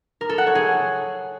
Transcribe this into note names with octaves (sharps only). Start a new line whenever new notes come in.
A#4
A4
F#5
C#5
G#4